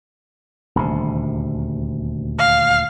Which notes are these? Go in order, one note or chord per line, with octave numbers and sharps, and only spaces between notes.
D#1 D2 C3
F5